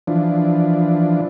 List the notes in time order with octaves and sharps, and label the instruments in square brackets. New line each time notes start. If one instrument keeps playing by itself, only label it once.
[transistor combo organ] E3 F3 D4